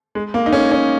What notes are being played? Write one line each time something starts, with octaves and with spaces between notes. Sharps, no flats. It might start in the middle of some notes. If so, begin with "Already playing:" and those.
G#3
A#3
D#4
C#4
C#4